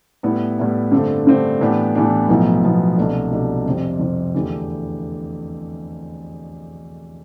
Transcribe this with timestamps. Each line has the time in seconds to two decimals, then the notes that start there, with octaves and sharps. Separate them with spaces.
0.23 A2 G3 B3 E4
0.58 A2 G3 B3 E4
0.91 G2 D3 A3 C4
1.27 G2 D3 A3 C4
1.61 A2 E3 B3 D4 G4
1.95 A2 E3 B3 D4 G4
2.29 B1 A2 F3 B3 E4
2.63 B1 A2 F3 B3 E4
2.98 C2 B2 A3 D4
3.32 C2 B2 A3 D4
3.66 F2 C3 G3 C4
3.99 F2 C3 G3 C4
4.34 E2 D3 A3 E4 G4